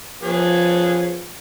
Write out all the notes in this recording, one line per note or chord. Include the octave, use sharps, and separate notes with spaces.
F3 B3 C#4 G#4